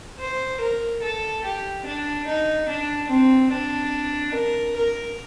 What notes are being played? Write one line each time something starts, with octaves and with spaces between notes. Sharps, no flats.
C5
A#4
A4
G4
D4
D#4
D4
C4
D4
A#4
A#4